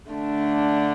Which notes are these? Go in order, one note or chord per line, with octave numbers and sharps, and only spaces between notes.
D3 A3 D4